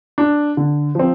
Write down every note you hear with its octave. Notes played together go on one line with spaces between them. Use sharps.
D4
D3
F3 C4